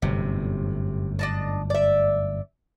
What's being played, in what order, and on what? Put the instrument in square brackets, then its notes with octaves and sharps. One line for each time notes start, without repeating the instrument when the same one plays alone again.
[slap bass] G1 F#2 A2 [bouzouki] C3
[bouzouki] D4 D#5 A5
D5 E5